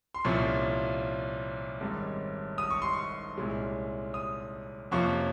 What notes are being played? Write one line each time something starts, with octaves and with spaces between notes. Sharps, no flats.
C6
C2 A#2 F3 A#3 C#4 C#6
G#1 G#2 G3 C#4
D#6
C#6
C6
C#6
C2 A#2 G#3 C#4
D#6
F2 C3 F3 A#3 C#4 C#6